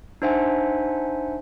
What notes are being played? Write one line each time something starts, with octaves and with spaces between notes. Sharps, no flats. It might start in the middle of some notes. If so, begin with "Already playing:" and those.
D4 D#4 C5 E5 F#5 G#5